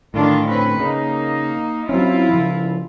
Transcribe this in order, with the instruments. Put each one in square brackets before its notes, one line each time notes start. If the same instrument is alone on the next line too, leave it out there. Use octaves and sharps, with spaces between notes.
[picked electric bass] A2 D3 [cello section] D#3 D4 F4
[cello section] C4 C#4 B4
[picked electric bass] C#3 [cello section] A#3 D#4
[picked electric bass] F#3 C4 C#4 [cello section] E4 F4
[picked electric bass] C#3 F3